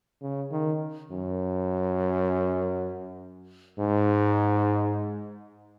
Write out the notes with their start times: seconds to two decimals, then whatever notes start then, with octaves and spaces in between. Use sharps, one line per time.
0.22 C#3
0.52 D#3
1.11 F#2
3.79 G#2